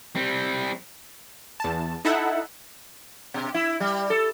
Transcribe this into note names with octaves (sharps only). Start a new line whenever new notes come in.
G3 C4
E2 A5
D#4 E4 A4 E5 F#5
B2
E4
G3
A4